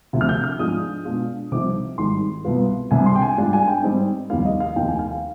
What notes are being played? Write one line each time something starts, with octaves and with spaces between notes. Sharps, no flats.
D2 C3 F3
F6
G6
F6
G#2 F3 G#3 D4 F4 D#6
B2 G#3 D4 F4
C2 C3 F3 C4 D#4 D6
G#1 G#2 D#3 G3 C6
C2 B2 B3 F4
C2 C3 G3 D4 G#5
C6
G5
G#5
G#2 G3 D4 F4
G#5
G5
G#2 G3 C4 D#4
F1 D#2 D#3 G3 F5
D#5
F5
F1 D#2 D#3 G5
G#5
F5
F5